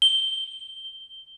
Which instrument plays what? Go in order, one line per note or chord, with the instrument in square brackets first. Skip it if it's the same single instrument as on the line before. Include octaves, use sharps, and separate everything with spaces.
[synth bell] G7